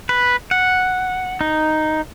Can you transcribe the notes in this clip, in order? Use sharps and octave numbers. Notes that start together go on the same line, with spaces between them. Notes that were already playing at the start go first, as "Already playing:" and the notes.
B4
F#5
D#4